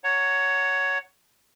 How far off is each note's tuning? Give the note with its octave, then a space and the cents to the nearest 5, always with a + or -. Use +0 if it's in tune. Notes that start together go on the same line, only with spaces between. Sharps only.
C#5 +10 F#5 +0 A#5 -20